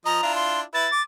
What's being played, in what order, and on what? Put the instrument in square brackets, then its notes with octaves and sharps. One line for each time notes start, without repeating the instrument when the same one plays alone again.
[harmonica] F3 D#5 [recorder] A#5
[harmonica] D4 E4 F4
[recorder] C6
[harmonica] E4 B4 [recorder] A6
[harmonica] D6